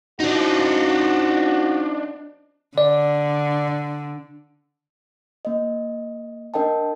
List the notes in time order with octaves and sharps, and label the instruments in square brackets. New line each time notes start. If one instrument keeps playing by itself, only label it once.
[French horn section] F3 F#4 [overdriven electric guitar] D4 D#4
[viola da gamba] D3 [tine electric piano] D5
[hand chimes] A#3 D#5
D4 A#4 D#5 G5 A5